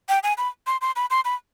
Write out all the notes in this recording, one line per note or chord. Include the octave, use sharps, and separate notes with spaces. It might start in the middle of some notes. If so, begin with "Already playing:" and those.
G5
G#5
B5
C6
C6
B5
C6
B5